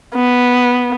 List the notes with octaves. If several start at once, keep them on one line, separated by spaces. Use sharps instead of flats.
B3